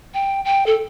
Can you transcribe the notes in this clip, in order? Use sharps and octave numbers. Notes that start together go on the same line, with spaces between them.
G5
G5
A4